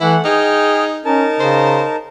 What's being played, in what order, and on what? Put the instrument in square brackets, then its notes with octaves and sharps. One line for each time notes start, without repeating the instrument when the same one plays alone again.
[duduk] E3 [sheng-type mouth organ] A3 F#5 [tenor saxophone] E4
[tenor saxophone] D#4 [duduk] G#4 [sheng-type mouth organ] G5 F6
[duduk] C#4 [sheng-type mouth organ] D#4 A#4 A5
[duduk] C#3 [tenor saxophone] C5